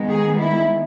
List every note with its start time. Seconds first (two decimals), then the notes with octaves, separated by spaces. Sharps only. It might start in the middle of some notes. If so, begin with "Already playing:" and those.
Already playing: D#3 G#3 B3
0.09 G#4
0.39 E4